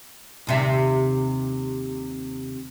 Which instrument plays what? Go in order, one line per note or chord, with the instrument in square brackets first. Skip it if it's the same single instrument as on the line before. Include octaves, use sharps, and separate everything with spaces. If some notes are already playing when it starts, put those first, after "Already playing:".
[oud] D#2 C3 E5